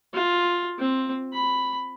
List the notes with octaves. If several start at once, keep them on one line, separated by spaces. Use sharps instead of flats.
F4
C4
B5